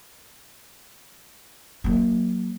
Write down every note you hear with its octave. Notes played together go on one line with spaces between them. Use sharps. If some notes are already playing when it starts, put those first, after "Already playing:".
F#3 A#3